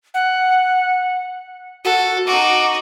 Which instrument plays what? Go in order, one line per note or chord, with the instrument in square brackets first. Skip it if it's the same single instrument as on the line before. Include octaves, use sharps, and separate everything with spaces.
[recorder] F#5
[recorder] F#4 [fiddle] A4
[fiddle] D#4 F#4 [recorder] D6